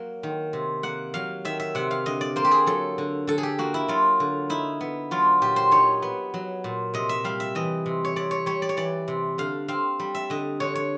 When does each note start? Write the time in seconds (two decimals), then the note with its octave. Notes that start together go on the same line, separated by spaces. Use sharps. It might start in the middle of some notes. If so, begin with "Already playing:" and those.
Already playing: F#3 A#3
0.23 D#3
0.53 C3
0.83 A#3 F#5
1.14 F#3 F5
1.45 D#3 E5
1.60 E5
1.75 C3 F#5
1.91 F5
2.06 D3 D#5
2.21 D5
2.36 A#3 C5
2.44 G4
2.51 G#4
2.67 F#3 A4
2.98 D3
3.27 D3 A4
3.38 G#4
3.43 G4
3.58 A#3 F#4
3.74 E4
3.88 F#3 F4
4.20 D3
4.50 D#4 E4
4.81 B3
5.11 F#3 F4
5.42 A#2 G4
5.56 C5
5.71 D#4 C#5
6.02 B3
6.34 F#3
6.64 A#2
6.94 C3 D#5
7.09 E5
7.24 G3 F5
7.40 E5
7.55 E3 D#5
7.86 C3
8.05 C#5
8.16 C3 D5
8.31 C#5
8.46 G3 C#5
8.62 D5
8.69 C#5
8.77 E3 D5
9.08 C3
9.38 D3 F5
9.68 C4 F5
10.00 G3
10.15 E5
10.30 D3 D#5
10.60 D3 C#5
10.75 C#5